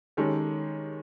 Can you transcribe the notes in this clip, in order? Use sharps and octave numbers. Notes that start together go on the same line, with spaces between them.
D#3 G#3 C#4 G4 A4